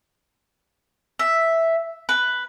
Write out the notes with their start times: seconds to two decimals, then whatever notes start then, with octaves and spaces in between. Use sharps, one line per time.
1.19 E5
2.09 B4